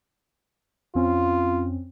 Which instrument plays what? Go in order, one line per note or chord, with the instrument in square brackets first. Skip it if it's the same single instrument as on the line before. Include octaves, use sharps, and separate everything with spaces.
[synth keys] F2 C4 C#4 [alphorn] F4